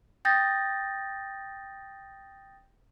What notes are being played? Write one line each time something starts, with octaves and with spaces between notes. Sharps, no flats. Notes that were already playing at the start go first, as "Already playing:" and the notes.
G5 D#6 G6 A6 A#6